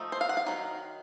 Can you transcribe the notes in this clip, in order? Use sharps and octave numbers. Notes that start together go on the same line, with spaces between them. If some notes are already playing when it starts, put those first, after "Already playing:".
Already playing: F3 A3 D#4
C5
F5
F#5
F5
D#3 F#3